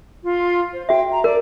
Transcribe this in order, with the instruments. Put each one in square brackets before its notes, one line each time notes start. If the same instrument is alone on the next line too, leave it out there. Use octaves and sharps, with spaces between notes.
[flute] F4
C5
[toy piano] F#4 E5 [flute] G5
[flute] A#5
[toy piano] A#4 [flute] D5